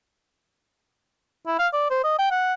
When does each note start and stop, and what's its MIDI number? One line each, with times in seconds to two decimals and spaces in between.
1.47 1.57 64
1.59 1.67 77
1.73 1.90 74
1.91 2.01 72
2.04 2.17 75
2.19 2.29 79
2.31 2.54 78